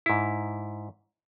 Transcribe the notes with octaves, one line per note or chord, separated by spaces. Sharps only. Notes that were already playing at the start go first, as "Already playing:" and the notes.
G#2 E4